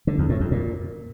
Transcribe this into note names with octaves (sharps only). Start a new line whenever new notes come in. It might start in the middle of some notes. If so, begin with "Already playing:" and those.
D3
E2
A2
F2
A#2